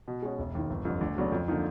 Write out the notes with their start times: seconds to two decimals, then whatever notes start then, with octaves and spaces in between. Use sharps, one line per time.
0.08 B2
0.22 G#3 C#4 F#4
0.38 E1
0.55 D#2 D#3
0.70 G1
0.85 F2 D3 G3
1.01 D2
1.17 C#3 F#3 B3 D4
1.32 F2
1.48 D3 F3 A#3 D#4